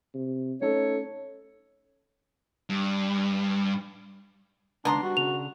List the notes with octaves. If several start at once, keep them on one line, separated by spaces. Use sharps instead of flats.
C3
A3 C#4 D#4 A4 C#5
G2
C#2 D#3 B3 D4 A#5 C6
G3 F#4
C#3 D4 F7